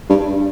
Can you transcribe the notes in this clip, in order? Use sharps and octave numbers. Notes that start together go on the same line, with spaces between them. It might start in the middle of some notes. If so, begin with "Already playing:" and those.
G2